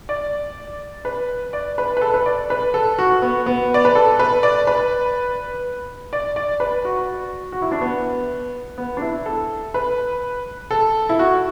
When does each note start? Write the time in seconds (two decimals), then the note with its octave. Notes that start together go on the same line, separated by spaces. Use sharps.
0.09 D5
1.05 B4
1.53 D5
1.78 B4
1.97 B4
2.01 A4
2.14 B4
2.26 D5
2.50 B4
2.74 A4
2.99 F#4
3.22 B3
3.46 B3
3.74 D5
3.85 B4
3.95 A4
4.19 B4
4.43 D5
4.67 B4
6.13 D5
6.36 D5
6.60 B4
6.85 F#4
7.52 F#4
7.62 E4
7.71 D4
7.81 B3
8.78 B3
8.97 D4
9.02 E4
9.26 A4
9.74 B4
10.71 A4
11.09 E4
11.19 F#4